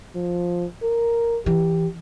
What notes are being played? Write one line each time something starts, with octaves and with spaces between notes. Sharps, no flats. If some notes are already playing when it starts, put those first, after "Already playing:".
F3
A#4
E3 G4